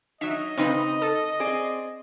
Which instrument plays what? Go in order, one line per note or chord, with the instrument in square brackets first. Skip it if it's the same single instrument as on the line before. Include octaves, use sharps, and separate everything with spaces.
[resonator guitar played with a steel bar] F#3 D#4 [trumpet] D#5 [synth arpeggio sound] E5
[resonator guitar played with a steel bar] C#3 D#4 [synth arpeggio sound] C4 B4
[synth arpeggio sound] A4
[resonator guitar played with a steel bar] C4 G#4 D5